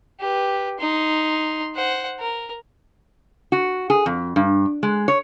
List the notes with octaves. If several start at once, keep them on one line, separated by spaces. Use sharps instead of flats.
G4 B4
D#4 C6
C5 F#5
A#4
F#4
G#4
F2
G2
G#3
C#5